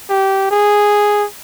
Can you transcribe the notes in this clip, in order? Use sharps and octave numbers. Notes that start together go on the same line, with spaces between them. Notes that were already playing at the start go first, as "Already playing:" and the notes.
G4
G#4